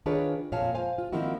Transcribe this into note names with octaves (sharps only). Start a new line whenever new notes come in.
D#3 D4 F4 G#4 B4 C#5
F2 A#2 F4 C#5 F5 A5
C5 F5 G#5
F4
D#3 F3 A#3 C4 E4 F#4